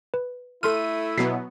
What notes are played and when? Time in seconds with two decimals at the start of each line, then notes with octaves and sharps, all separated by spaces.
0.14 B4
0.63 A3 E4 A4 C6 F6 D#7
1.18 B2 F#3 B3 B6 C7